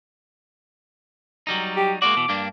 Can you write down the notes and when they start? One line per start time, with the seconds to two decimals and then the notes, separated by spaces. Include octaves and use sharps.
1.47 F#3 G3 D#4
1.76 G4
2.02 G#3 A#3 F#4 D6
2.17 B2 E3
2.29 G2 A#3 D4